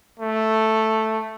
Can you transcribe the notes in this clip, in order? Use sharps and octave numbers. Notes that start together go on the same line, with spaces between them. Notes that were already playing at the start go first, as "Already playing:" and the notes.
A3